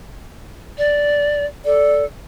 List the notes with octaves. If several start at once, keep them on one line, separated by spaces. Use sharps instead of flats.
D5
A4 D5